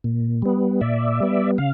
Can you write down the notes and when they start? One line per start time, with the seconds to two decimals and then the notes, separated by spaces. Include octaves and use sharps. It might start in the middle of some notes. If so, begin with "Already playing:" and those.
0.04 A#2
0.42 G3 B3
0.81 A#2 D5 E5
1.20 G3 B3
1.58 C#3 F5